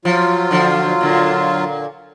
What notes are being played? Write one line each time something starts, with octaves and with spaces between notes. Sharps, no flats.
F3 F#3 F4
D3 F3
A#2 D3